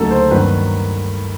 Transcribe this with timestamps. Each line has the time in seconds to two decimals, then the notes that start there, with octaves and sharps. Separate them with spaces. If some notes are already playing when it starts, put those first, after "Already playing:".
Already playing: D2 C#3 F#3 A#3 D#4 A4
0.11 C5
0.31 G2 D#3 F#3 A#3 B4